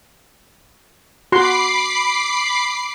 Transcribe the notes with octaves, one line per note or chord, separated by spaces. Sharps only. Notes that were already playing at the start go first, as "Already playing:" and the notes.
F#4 B5 C6 D6 C7